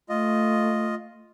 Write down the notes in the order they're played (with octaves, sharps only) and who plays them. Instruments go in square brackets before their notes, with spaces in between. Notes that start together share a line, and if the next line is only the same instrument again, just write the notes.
[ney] A3 [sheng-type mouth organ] F4 D#5